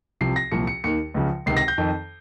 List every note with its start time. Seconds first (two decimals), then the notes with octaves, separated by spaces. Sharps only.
0.21 C2 C3 F3 C7
0.36 A#6
0.52 C2 A#2 F3 C#7
0.67 C#7
0.84 D#2 D#3 C#7
1.14 C#2 C#3 F3
1.46 C#2 C3 D#3 C7
1.57 A#6
1.68 G6
1.78 F2 D#3